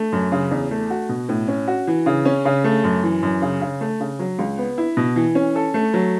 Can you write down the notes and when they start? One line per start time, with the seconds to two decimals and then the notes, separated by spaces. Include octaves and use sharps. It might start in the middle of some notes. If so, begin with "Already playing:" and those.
Already playing: A3
0.12 F#2
0.32 C#3
0.51 E2
0.71 A3
0.90 F#4
1.09 B2
1.29 A2
1.48 C#4
1.68 F#4
1.87 E3
2.06 C#3
2.25 C#4
2.45 C#3
2.64 A3
2.84 F#2
3.03 E3
3.23 F#2
3.42 C#3
3.61 C#3
3.81 A3
4.00 C#3
4.19 F#3
4.39 C#2
4.58 B3
4.78 E4
4.97 B2
5.16 E3
5.35 C#4
5.56 A4
5.74 A3
5.94 F#3